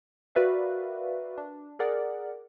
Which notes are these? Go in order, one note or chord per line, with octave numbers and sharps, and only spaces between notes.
F#4 A#4 B4 D5 E5 F5
D4
G#4 A#4 D5 F#5